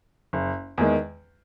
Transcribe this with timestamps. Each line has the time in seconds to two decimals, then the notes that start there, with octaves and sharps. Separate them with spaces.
0.33 F#1
0.78 E2 D#3 G#3